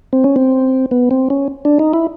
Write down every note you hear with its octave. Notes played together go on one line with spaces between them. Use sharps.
C4
C#4
C4
B3
C4
C#4
D4
D#4
E4